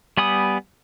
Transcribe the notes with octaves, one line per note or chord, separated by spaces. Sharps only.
G3 B3 G#5 B5 D#6